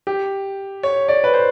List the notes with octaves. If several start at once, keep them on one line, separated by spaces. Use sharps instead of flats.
G4
C#5
D5
B4
C5